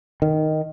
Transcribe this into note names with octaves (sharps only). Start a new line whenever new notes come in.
D#3